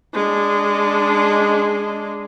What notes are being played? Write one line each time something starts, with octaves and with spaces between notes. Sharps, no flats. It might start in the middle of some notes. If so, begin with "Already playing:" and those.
G#3 D4